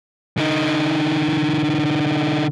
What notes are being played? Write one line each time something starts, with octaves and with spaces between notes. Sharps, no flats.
D3 D#4